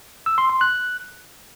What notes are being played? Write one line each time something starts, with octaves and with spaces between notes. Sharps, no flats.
E6
C6
C6
F#6